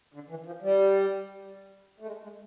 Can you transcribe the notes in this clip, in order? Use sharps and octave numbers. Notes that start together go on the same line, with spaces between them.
D3
E3
F3
G3
A3
G#3
G#3